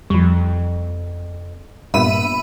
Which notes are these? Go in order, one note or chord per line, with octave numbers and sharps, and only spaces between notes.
F2 F3 G3
G2 A#2 B3 E5 B5 D#7